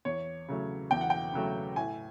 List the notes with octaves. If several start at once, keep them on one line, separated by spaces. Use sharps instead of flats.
E2 C#5
C#3 F#3 A3
E2 G5
F#5
G5
C#3 F#3 A3
A2 G#5